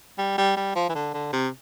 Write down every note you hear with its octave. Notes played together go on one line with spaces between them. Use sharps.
G3
G3
G3
F3
E3
D3
D3
C3